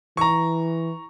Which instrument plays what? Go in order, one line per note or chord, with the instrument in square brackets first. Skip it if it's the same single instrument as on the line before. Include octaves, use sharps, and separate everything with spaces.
[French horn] E3 [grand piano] A#5 C#6